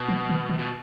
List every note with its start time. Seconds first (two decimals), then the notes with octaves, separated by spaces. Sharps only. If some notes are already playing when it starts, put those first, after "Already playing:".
Already playing: B2
0.09 F3
0.29 D#3
0.49 D#3
0.59 B2